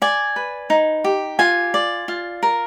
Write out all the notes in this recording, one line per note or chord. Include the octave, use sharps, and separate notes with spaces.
D5 G#5
B4
D#4
G4
F4 G#5
D5
F4
A#4